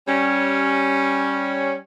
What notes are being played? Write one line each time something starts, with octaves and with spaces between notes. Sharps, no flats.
G3 C#4